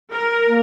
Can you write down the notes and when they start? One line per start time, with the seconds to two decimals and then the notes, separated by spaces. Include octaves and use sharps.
0.11 A#4
0.47 A#3